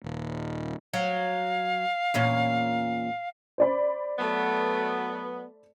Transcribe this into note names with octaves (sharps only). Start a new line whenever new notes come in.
D#1
F#3 F5
E2 A#2 C#4
C5 D5 B5
F#3 A3 B3